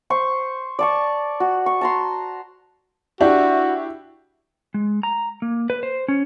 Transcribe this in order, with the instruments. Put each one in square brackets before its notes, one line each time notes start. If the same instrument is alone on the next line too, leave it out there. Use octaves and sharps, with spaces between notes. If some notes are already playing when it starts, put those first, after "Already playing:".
[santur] C5 C#6
D5 A5 C#6
F#4
C#6
A5 A#5 C6
[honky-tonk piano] D4 E4 G4 [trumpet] F#4
[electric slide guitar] G#3
A#5
A#3
B4
C5
C#4